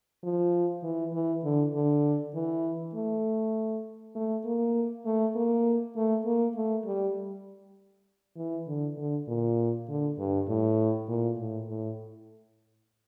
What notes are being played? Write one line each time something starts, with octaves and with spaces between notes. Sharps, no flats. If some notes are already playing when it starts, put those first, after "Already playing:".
F3
E3
E3
D3
D3
E3
A3
A3
A#3
A3
A#3
A3
A#3
A3
G3
E3
D3
D3
A#2
D3
G2
A2
A#2
A2
A2